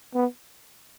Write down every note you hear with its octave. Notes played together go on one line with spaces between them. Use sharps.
B3